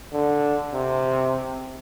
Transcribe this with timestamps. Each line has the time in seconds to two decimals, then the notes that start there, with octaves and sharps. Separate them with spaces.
0.13 D3
0.74 C3